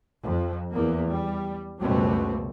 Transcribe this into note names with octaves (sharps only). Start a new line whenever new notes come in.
F2
E2 A#3
G3
C#2 F#2 B2 G3 A3 C4